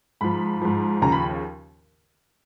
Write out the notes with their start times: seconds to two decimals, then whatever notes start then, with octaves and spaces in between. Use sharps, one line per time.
0.21 G#2 F3 B5
0.62 G#2 F3
1.02 D#2 C#3 F3 A#5
1.12 B5